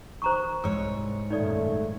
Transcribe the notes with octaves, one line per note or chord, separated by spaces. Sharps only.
D#3 C5 A#5 C#6
C2 G#2 C#5 E6
F#2 A#2 D#3 A3 D#4 D5